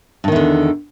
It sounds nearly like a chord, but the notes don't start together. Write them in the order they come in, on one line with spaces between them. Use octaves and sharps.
G2 D#3 E2 D3